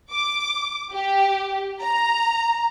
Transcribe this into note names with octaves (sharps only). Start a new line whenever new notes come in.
D6
G4
A#5